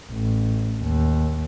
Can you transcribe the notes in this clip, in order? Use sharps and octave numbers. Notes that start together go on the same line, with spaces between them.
A1
D#2